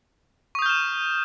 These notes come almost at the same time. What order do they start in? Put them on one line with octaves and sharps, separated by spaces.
C#6 D#6 G6 F6 E7